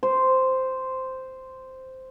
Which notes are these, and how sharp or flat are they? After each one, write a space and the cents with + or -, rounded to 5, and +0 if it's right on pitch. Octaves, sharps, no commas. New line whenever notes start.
C5 -5